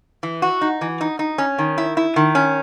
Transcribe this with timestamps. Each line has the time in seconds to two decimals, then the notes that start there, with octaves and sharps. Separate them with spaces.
0.23 E3
0.42 F#4
0.61 D#4
0.81 E3
1.01 D#4
1.19 D#4
1.38 C#4
1.58 D#3
1.78 E4
1.97 E4
2.16 D#3
2.35 C#4